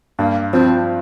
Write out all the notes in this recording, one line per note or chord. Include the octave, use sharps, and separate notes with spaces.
G2 A#3
F3 C4